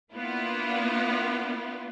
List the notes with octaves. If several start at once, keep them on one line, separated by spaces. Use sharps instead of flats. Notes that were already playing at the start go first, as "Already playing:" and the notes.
A#3 B3 D4 E4 F4